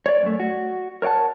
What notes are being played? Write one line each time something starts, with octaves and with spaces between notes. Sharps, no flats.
C#5 D5
F#2 A3
F#4
A#4 C#5 D5 F#5 A5